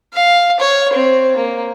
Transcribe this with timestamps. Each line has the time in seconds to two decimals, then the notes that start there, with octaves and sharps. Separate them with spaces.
0.14 F5
0.60 C#5
0.93 C4
1.37 A#3